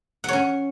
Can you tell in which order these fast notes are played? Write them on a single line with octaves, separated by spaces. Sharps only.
F#5 C#5 C#4